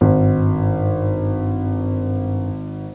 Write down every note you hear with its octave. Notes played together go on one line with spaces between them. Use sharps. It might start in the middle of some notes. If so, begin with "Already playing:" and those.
G#1 G2